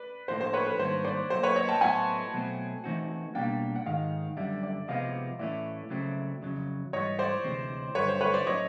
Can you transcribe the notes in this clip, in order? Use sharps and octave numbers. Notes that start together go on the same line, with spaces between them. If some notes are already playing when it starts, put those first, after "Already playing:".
Already playing: B4 D5
A2 F3 A#3 D4 F4 C5
C5
B4 C#5
B4
G#2 D#3 G3 A#3 D4 C5
C5 D5
A#2 F#3 A#3 C5
B4 C#5
C#5 D#5
G5 A5
A2 F#3 B3 E4 A4 F#5 G#5
B2 F#3 A3 C4
E3 A3 C4 D#4 F#4
B2 G3 A#3 D4 F5 G5
F#5
G#2 D#3 G#3 D#5 F5
F#2 D3 G3 D5 E5
D5 E5
C3 F3 G#3 B3 D#5 F5
A2 E3 A3 C#4 D5 E5
C#3 F#3 A3 C4
F2 C#3 F#3
G#2 E3 G3 C#5 D#5
C5 D5
D2 C3 E3 G#3 C4
G2 D3 F#3 B4 C#5
C5
B4 C#5
C5 D5
A2 F#3 A3 C#4 C#5 D#5